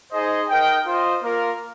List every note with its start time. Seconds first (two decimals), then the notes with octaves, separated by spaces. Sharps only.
0.12 D#4 G#4 C5 D#5
0.49 D#4 A#4 D#5 G5
0.86 F4 C5 D#5
1.23 A#3 F4 A#4